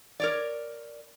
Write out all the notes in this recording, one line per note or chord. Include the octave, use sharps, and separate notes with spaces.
A#4 C#5 D5